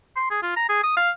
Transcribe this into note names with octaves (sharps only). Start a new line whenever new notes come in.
C6
G#4
F4
A#5
G#4
D#6
F5